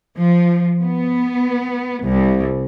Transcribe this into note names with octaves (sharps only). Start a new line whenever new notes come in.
F3
B3
C2